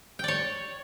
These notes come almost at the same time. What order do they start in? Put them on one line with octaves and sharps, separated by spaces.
G5 D5 C#5